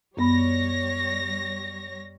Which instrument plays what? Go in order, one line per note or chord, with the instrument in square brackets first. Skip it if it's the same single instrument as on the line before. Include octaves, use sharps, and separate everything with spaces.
[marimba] F#2 B3 B5 [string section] G3 C#5 A#6